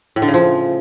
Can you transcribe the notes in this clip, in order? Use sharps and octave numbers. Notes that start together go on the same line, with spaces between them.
A2
D3
C#3
F3